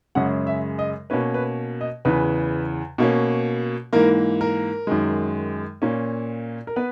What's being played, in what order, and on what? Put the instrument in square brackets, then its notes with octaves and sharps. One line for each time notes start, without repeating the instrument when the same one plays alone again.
[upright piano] F#2 C#3 G#3 C#4 F#5
E5
D#5
B2 A#3 C#4 B4
B4
D#5
E2 C#3 E3 B4
B2 A#3 C#4
G#2 E3 A#3 A#4
A#4
F#2 D#3 G#3
A#2 A#3 C#4
A#4
B3 B4